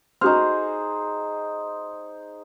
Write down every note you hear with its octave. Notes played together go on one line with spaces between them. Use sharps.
D#4 F#4 G#4 C5 F6